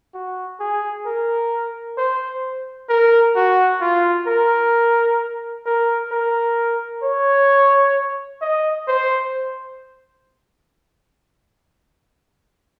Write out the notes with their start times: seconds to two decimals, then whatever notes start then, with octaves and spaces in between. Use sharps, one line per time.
0.14 F#4
0.60 G#4
1.06 A#4
1.97 C5
2.89 A#4
3.36 F#4
3.81 F4
4.27 A#4
5.66 A#4
6.12 A#4
7.03 C#5
8.42 D#5
8.88 C5